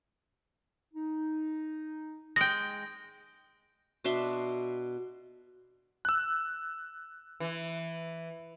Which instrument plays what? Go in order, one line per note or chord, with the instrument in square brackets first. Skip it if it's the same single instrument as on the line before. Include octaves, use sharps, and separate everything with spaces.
[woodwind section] D#4
[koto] G#3 G5 [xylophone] A#6
[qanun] B2 D4 E5 C6
[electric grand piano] E6 F#6
[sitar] E3